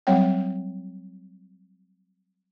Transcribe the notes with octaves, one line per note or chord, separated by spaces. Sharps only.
F#3 G3 C4 C#5 F#5 G5